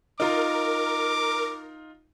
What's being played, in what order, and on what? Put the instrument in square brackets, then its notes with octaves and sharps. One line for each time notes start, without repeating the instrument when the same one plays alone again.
[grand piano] D#4 F4 [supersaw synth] A#4 [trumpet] D6